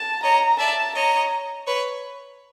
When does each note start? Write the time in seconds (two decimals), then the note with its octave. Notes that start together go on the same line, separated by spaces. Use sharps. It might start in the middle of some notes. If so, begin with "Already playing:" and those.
Already playing: A5
0.23 C#5 D#5 A#5
0.59 D5 E5 A5
0.95 C#5 D#5 A#5
1.67 B4 C#5